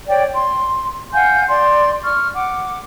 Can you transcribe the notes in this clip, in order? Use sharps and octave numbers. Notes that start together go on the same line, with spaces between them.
C#5 D5 G5
C6
F5 F#5 G#5 G6
D5 C6
C#6 F6
F#5 D6